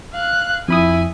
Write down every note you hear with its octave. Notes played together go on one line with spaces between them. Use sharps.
F5 F#6
F2 E4 G#5 B5 D#6